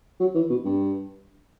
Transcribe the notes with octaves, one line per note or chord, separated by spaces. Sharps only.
F#3
E3
B2
G2